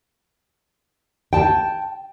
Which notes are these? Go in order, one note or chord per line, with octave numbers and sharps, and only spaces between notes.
G5 A5